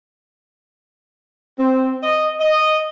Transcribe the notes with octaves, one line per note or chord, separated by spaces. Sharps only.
C4
D#5
D#5